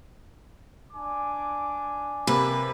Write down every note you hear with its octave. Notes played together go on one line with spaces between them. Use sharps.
D4 G#5 D6
C3 A#3 B4 B5